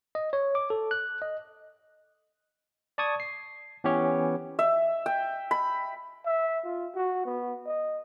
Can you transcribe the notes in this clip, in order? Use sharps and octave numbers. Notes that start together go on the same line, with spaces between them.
D#5
C#5
D6
A4
F#6
D#5
D5 A5 C#6 D#6 G#6
C7
E3 B3 C#4 G4 C#5
E5
G5
B5
E5
F4
F#4
B3
D#5